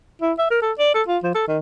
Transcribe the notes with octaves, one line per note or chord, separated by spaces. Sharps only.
E4
E5
A#4
A4
D5
A4
F4
F3
A4
D#3